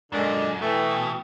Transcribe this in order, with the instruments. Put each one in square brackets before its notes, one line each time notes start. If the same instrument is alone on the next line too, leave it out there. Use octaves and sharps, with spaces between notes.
[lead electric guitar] F#2 [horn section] A#2 D3 D4 [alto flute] G#3
[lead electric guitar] B2 [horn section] E3 A3 [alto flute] G5